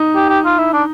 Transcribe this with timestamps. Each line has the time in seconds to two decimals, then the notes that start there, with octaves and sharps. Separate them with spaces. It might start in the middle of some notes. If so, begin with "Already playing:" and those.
Already playing: D#4
0.15 G4
0.29 G4
0.45 F4
0.58 E4
0.73 D4